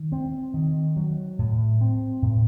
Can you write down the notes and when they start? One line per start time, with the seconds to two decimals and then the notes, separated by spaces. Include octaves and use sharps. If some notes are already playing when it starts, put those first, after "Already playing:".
Already playing: D#3
0.12 C4
0.54 D#3
0.96 F#3
1.39 A2
1.81 C4
2.22 A2